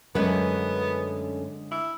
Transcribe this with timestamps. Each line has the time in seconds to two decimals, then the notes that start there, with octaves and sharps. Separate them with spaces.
0.15 F#2 D3 G#3 A3 B3 C#4 B4
1.71 E4